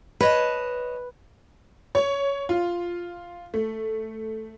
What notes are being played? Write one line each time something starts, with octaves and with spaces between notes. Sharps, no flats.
B4 C#5 D#5 A5
C#5
F4
A3